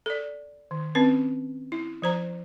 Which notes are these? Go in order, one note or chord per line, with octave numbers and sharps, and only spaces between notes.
A4 D5
D#3
C4 C#4 B4
E4
F3 C5 A#5